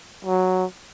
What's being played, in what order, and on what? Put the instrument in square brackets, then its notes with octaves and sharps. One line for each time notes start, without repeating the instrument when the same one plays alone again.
[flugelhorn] F#3